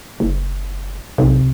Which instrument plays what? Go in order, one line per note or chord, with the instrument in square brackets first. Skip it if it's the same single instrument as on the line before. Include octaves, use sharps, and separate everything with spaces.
[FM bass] F#1
[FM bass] B1 [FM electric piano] C3